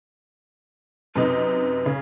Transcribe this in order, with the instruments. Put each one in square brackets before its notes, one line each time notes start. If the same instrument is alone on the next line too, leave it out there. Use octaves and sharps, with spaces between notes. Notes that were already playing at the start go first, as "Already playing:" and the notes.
[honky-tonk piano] F#2 C3 D#4 [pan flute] B4
[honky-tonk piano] C#3